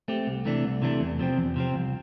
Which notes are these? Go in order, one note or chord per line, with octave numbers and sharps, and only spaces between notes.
A3 C4 G4
C2
C3 E3 A3 D4
C2
C3 E3 A3 D4
E2
C3 F3 C4
E2
C3 F3 C4
C2